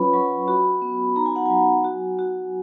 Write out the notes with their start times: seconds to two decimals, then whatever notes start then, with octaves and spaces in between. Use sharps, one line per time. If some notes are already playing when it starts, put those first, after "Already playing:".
Already playing: F#3 C#4 F4 B4 C#5 B5
0.13 F#3 C#6
0.48 F#4 B5
0.82 B3
1.16 D#4 A#5
1.26 G#5
1.36 F#5
1.46 F#3 G#5
1.84 F#4
2.19 F#4